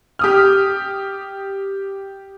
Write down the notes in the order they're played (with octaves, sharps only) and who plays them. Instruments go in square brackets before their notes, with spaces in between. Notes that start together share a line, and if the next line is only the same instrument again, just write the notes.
[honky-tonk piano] G4 D#6 F6